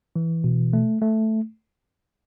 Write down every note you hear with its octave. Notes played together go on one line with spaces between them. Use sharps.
E3
B2
A3
A3